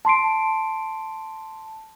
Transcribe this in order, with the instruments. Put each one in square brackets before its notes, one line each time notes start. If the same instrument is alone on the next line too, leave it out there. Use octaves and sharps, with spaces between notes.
[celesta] A5 C6 C7 D7